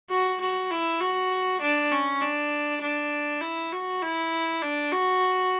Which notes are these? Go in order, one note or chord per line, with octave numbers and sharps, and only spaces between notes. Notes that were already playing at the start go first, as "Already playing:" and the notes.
F#4
F#4
E4
F#4
D4
C#4
D4
D4
E4
F#4
E4
D4
F#4